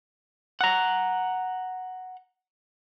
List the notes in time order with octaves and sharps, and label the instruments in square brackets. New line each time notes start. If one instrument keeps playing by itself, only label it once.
[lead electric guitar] F#5 A#5